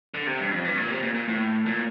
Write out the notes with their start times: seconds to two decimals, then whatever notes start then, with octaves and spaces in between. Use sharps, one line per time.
0.14 D3
0.27 C3
0.39 G2
0.51 F2
0.65 G2
0.78 A#2
0.90 C3
1.03 A#2
1.15 A#2
1.28 A2
1.66 A#2